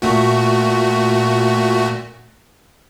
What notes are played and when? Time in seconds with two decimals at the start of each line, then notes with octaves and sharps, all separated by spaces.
0.02 A#2 A3 F#4